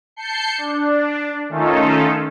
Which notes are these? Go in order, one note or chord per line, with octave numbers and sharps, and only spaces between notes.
A5 G6 C7 C#7
D4
D#3 A3 C#4 D#4 F4 A4